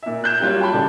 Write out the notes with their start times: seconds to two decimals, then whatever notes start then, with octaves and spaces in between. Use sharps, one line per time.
0.03 A#2 E5
0.24 F#6 G6 E7
0.40 F#3 G3 A#3 F4 C#5
0.61 G5 A5 B5
0.73 D#1 A1 C#3 A4 D5 A5